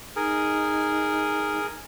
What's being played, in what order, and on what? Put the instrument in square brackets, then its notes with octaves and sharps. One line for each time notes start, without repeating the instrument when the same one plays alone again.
[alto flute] D#4 [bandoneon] G#4 A#4